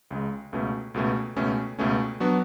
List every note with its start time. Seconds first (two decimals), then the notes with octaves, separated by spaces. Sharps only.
0.11 C#2 C#3 G#3
0.53 C#2 B2 A3 C#4
0.94 C#2 B2 A3 C#4
1.36 C#2 B2 A3 C#4
1.79 C#2 B2 A3 C#4
2.20 F#3 B3 D4 F#4